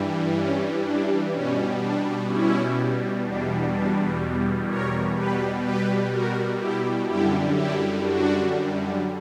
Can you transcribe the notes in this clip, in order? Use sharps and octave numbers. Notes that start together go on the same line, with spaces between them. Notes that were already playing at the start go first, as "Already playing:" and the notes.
Already playing: G2 E3 G3
C#4
D4
B2 G3 C#4
D4
C#4 E4
E2 B2 G3 D4
D4
A#4 C#5
B2 G3 G4 B4
G4 B4
F#4 A#4
E4 G4
F#2 D3 G3 E4 G4
E4 G4
D4 F#4